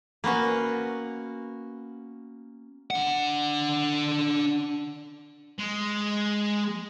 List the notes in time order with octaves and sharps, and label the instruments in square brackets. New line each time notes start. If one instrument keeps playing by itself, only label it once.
[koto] A#3 B3 C#4 F#4
[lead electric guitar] D4 F#5
[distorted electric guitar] G#3